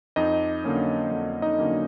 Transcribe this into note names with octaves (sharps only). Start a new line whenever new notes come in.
F2 D#4 D#5
D3 F#3 A#3 C#4
F2
D#4 D#5
D3 F#3 A#3 C#4